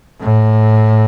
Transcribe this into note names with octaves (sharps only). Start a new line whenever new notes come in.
A2